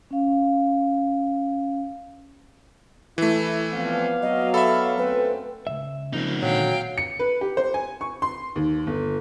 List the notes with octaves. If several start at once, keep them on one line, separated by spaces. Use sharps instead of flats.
C#4 F5
E3 A3 E4
F3 B3 C4 D5 F5
F#3 D#5
A4 E5 B5
F#2 A3 C4 B4
C#2 F#2 E5
C#3 F3 A#3 C4 D#4
A#2 D3 D#3 F#3 F5 G5
C#7
B4
G4
C5
G#5
C#6
C6
D#2
G1